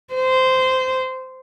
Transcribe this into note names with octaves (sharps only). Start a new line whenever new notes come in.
C5